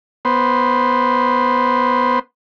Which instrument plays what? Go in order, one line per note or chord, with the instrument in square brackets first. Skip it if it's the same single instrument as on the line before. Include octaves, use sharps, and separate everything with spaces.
[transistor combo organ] B3 C5